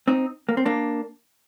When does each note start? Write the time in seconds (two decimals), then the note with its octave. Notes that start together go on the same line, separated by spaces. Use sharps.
0.08 C4 D#4
0.49 A#3
0.57 C4
0.66 A#3 D4